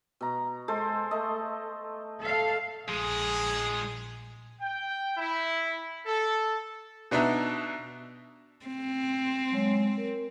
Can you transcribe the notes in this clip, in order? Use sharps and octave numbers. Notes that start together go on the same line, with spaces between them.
B2 A#5
G#3 A4 C5
A3 D#5
A4 F5
A#1 F3 G#3 G#4
G5
E4
A4
B2 B3 D4 D#4 E5 A#5
C4
F#3 G#3 C#5
A#4